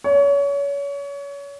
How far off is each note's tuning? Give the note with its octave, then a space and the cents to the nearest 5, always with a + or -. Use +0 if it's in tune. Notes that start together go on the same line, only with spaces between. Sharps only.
C#5 +30